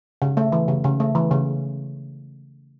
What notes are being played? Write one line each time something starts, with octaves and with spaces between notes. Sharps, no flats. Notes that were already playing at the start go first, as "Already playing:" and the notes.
C#3
A3
E3
C#3
C#3
A3
E3
C#3